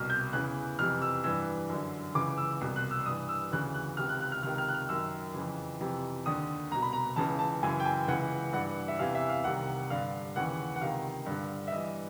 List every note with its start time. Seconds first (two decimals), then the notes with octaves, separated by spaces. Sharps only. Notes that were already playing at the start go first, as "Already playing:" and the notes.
Already playing: C2 B2 F6
0.10 G6
0.33 E2 C#3 E3 F#6
0.79 F2 C3 E3 F6
1.02 E6
1.24 G2 E3 E6
1.69 F#2 D3
2.15 C#2 C#3 E3 D6
2.38 E6
2.61 C2 B2
2.76 F#6
2.91 E6
3.06 G2 E3 D#6
3.29 E6
3.52 D2 C#3 E3 F#6
3.74 F#6
3.97 C#2 C3 D#3 F6
4.09 F#6
4.21 F#6
4.32 F6
4.43 C#2 C3 D#3 F6
4.58 F6
4.68 F#6
4.74 F6
4.89 F#2 D#3 E6
5.34 F2 C#3 E3
5.81 F2 C3 E3
6.26 D#2 D3 D#6
6.71 C2 B2 A#5
6.82 B5
6.93 A#5
7.16 C#2 C#3 E3 A5
7.39 A5
7.63 F#2 C#3 E3 G#5
7.80 G5
7.86 G#5
8.08 C#2 C#3 E3 F#5
8.53 G2 E3 F#5
8.88 E5
8.99 E2 C3 E3 F5
9.15 E5
9.29 F5
9.44 C2 C3 D#3 F#5
9.90 G2 D3 F5
10.36 D#2 C#3 E3 F#5
10.76 F#5
10.81 C#2 C3 D#3 F5
11.26 G2 D3
11.68 E5
11.72 G2 E3 D#5